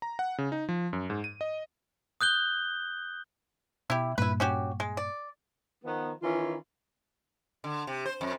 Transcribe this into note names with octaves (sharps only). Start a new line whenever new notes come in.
A#5
F#5
C#3
D#4
F3
F#2
G#2
D#7
D#5
D#6 F#6 G6 G7
B2 E4 G4
G2 A#2 E4 B4
C#4 F#4 G4
G#3
D5
D#3 F3 B3
D#3 E3 C#4 F4
D3
C3
C5
F2